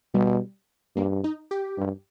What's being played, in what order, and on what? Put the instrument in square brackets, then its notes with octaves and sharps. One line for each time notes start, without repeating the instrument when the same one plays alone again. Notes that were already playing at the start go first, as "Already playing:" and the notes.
[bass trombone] B2 [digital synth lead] G3
[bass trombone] G2 [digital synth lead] A#3
[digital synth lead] D#4
G4
[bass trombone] G2